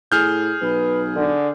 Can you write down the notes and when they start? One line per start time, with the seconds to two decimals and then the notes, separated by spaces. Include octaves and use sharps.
0.12 A2 G#4 F6 G6
0.62 B1 B4
1.16 D3